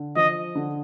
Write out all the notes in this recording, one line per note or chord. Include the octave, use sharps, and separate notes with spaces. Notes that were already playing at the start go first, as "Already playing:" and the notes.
Already playing: D3
F3 D#5
D3